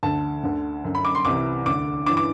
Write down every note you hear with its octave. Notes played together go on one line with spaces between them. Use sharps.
D2 D3 A5
D2 D3
F#2 D3
B5
D6
C6
C2 C3 E3 D6
D2 D3 D6
G2 E3 D6
D6